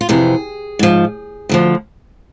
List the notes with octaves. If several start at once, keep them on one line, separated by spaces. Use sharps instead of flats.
F4
F2 C3 E3 G#4
G#2 F3
D2 D3 F3